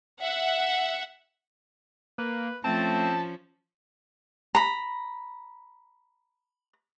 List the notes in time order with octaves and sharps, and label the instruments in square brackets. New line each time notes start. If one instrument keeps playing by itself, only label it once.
[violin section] E5 F#5
[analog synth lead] A#3 [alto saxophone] B4
[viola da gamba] F3 C#4 [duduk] A3 [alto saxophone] C4 [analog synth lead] A5
[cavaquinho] A#5 B5